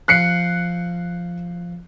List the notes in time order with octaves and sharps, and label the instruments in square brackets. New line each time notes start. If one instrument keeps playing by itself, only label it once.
[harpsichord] F3 F5 [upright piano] F#6 C7 C#7